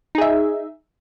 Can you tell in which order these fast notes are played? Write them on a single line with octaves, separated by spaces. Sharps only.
D#4 G#4 E5